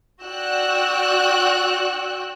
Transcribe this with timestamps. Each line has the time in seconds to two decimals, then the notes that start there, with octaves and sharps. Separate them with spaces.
0.23 F#4 D5 G5 E6 F#6